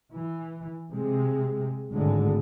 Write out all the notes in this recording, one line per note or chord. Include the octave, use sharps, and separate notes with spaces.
E3
C3 G#3
G#1 A2 D3 G#3